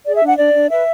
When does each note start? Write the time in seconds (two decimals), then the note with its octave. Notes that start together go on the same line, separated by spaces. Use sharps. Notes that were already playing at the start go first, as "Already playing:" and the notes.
0.06 G#4 D5
0.16 E5
0.22 D4
0.27 F#5
0.38 D4 D5
0.54 D4
0.70 B4 E5